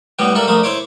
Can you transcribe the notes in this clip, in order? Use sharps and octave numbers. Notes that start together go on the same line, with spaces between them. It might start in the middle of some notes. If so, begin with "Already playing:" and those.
A2 G3 B3 G4
G3 A#3 A4 E5 B5
A#1 A3 A#3 D#6
E4 C5 C#5 D6